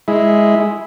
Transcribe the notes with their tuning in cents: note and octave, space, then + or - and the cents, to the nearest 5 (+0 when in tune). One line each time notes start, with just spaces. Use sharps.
G#3 +0 E4 -10